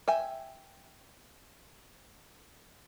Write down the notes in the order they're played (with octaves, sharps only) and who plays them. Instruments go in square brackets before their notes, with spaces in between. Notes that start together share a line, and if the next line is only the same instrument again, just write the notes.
[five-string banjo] E5 G5 G#5